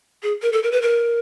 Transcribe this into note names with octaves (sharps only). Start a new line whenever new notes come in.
G#4
A#4
A4
A#4
B4
A#4